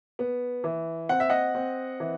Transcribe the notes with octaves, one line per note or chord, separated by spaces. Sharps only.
B3
E3
C4 F#5
E5
D#5 F#5
C4
E3